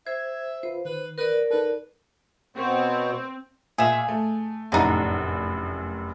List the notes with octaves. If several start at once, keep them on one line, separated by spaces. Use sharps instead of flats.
C5 E5 G#6
F4 B4 C5
D#3 B4
A#4 B4 D5
D#4 A4 B4
B2 B3 C4 C#5
A#2 G#3 G#4 E5 E7
A3
F1 F#2 A2 D3 D#4